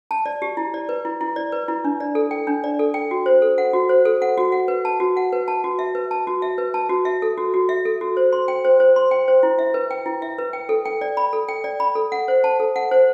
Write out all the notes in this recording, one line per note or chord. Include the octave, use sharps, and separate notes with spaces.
A5
D5
G4
E4
D5
B4
E4
E4
D5
B4
E4
D4
D5
A4
G5
D4
D5
A4
G5
F#4
C5
A4
F#5
F#4
C5
A4
F#5
F#4
F#5
B4
A5
F#4
F#5
B4
A5
F#4
E5
B4
A5
F#4
E5
B4
A5
F#4
E5
A4
F#4
F#4
E5
A4
F#4
C5
C6
G5
C5
C5
C6
G5
C5
E4
E5
B4
G5
E4
E5
B4
G5
A4
G5
D5
B5
A4
G5
D5
B5
A4
F#5
C5
A5
A4
F#5
C5